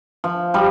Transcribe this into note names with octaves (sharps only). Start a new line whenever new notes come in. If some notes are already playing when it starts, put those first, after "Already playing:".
F3
F3 G3